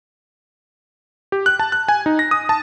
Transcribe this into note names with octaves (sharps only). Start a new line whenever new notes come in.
G4
F#6
A5
F#6
G#5
D#4
A#6
D#6
A5